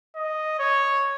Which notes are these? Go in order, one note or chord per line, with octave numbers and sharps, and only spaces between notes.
D#5
C#5